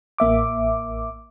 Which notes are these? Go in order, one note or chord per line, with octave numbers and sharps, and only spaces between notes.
A1 A#3 E5 D6